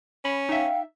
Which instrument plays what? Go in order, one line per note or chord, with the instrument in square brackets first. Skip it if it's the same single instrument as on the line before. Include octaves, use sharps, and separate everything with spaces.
[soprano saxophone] C#4 [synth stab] B5
[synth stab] D#4 E5 [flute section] F5 G5